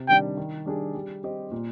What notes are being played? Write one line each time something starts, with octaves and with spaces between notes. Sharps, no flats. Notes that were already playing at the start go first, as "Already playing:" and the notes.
Already playing: C3
D#3 G3 D4 G5
D#3
G3 D4 G#4 D5
G3
C4 G4 C5 D#5
A#2